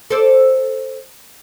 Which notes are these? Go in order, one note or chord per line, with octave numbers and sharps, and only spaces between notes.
A4 C5 D5